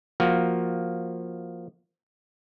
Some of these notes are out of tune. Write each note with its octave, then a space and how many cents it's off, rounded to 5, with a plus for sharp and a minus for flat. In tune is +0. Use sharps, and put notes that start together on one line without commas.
F3 +0 A#3 +5 F#4 +0